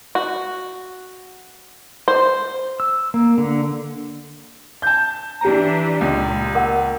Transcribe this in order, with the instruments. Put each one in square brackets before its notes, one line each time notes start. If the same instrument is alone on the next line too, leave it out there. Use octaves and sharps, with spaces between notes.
[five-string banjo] F#4
C5
[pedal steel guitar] E6
A#3
D3
[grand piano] A5 G6
[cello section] E3 C#4 D4 [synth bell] G4 A#5
[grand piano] C#2 [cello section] A#2
[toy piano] A#4 F#5